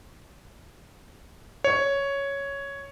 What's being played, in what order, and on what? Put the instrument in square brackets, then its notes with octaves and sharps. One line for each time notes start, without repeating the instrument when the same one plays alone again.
[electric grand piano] C#5